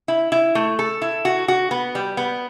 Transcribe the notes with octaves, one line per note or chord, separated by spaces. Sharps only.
E4
E4
A3
A4
E4
F#4
F#4
B3
G3
B3